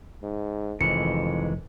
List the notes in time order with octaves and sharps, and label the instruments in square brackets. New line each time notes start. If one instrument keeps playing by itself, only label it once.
[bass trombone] G#2
[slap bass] F1 [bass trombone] F2 [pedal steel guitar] D#3 E3 G#3 [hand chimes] C#7